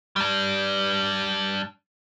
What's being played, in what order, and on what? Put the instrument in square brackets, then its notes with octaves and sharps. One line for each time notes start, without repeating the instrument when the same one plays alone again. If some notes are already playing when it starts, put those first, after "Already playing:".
[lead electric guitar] G3 D4